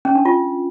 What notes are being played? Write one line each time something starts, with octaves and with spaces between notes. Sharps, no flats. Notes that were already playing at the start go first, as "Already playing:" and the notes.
C#4
D4
F4